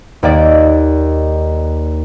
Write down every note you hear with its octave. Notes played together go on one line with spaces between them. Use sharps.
D#2 A#3 D5